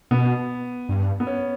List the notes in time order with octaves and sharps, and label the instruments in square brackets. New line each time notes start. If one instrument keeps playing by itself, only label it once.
[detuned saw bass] B2 [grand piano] B3
[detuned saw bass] G2
[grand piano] B3
C#4